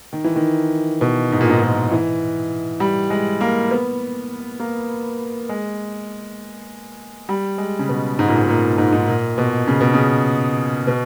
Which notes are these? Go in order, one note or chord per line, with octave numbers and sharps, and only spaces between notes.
D#3
E3
D#3
B2
G#2
A#2
G#2
A#2
E3
G3
G#3
A#3
B3
A#3
G#3
G3
G#3
C#3
B2
G#2
A#2
G#2
A#2
G#2
G#2
A#2
B2
C#3
B2
C#3
B2